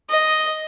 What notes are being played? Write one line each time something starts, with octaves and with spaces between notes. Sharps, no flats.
D#5